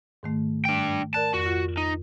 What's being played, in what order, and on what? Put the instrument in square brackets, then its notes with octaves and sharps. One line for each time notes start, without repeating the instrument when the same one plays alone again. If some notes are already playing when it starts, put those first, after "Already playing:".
[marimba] G#2 D#3 A3
[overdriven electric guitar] D4 G5
[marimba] A#4 D5 F#6 [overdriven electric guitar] A5
[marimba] F2 [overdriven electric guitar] F#4
[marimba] F4
[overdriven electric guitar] D#4